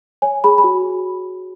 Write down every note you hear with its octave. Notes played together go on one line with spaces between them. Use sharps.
C#5 G#5
G#4 B5
B5
F#4